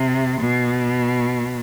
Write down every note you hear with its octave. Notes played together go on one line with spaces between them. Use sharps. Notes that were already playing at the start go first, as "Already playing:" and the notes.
Already playing: C3
B2